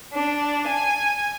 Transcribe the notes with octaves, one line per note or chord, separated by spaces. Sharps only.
D4
G#5